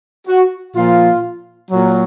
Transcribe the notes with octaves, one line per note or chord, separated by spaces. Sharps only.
F#4
A#2 F3 F4
A#2 F#3